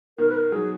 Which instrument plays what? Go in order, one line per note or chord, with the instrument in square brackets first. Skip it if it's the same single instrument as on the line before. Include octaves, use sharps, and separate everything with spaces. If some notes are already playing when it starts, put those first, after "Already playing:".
[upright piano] B2 D#3 [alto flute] A#4
[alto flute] B4
A#4
[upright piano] D#3 F#3 [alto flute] G#4